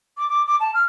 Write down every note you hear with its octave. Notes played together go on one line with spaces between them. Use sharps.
D6
D6
D6
A5
F6